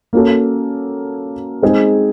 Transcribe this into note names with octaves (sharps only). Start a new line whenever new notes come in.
A#3 C#4 F#4 A4
G#3 C4 D#4 G#4